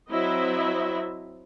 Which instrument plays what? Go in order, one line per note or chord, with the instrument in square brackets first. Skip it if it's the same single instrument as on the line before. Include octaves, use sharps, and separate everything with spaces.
[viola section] F#3 C4 E4 D#5 E5